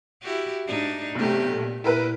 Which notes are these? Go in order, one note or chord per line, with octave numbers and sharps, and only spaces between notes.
E4 F#4 G4
G#2 D4 D#4
B1 C3 A3 G4
A#2
A#2 E4 A#4 B4